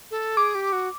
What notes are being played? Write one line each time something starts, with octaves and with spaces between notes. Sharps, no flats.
A4
G#4 D6
G4
F#4